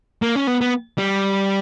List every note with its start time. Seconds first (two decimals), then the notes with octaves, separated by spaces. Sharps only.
0.22 A#3
0.35 C#4
0.47 B3
0.61 B3
0.98 G3